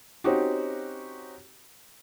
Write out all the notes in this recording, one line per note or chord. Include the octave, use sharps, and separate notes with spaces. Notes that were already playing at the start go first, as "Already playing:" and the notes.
C4 C#4 D#4 F#4 G4